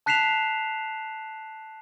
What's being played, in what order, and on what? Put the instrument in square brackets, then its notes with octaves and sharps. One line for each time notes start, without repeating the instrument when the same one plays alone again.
[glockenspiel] A5 F#6 B6 C7 E7 F7